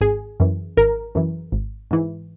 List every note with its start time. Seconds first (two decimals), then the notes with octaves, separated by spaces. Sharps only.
0.01 G#1 G#4
0.40 F#2 E3
0.77 G#1 A#4
1.15 F#2 E3
1.52 G#1
1.91 G#2 E3